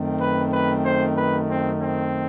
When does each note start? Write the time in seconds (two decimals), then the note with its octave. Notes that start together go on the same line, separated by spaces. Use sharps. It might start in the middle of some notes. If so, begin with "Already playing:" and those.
Already playing: F#2 D#3 A3 C4
0.21 B4
0.53 B4
0.85 C5
1.17 B4
1.49 C4
1.81 C4